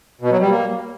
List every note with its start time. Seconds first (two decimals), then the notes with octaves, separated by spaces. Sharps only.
0.21 B2
0.31 F#3
0.41 G3
0.50 A#3